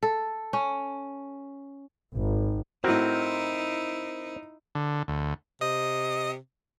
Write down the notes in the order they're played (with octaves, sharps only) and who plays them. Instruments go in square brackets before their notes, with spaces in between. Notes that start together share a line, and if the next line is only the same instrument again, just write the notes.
[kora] A4
C#4
[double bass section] G#1
[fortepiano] A2 F#4 [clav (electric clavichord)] C4 A#4 [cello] D#4 E4
[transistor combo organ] D3
D2
[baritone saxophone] C3 [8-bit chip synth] D#5 D#6